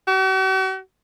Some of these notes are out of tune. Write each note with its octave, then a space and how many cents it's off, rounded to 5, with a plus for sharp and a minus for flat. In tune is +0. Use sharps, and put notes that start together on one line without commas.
F#4 +45